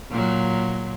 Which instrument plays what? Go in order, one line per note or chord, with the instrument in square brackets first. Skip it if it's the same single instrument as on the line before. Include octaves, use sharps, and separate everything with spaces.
[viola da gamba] A#2 F#3